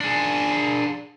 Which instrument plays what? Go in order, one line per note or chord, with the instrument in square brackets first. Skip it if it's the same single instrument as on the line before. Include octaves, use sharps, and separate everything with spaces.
[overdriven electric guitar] D4 G#4